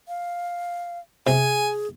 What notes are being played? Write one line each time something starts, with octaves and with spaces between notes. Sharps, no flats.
F5
C3 G#4 G#5